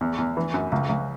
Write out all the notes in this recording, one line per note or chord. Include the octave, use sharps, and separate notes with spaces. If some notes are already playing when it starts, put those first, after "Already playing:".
E2
E2
E3
F#2
C#2
C#2